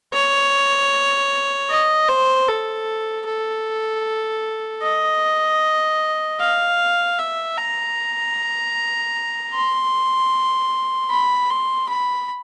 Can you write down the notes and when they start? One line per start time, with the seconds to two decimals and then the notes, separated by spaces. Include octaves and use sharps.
0.13 C#5
1.69 D#5
2.09 C5
2.48 A4
3.26 A4
4.83 D#5
6.40 F5
7.18 E5
7.57 A#5
9.53 C6
11.10 B5
11.50 C6
11.89 B5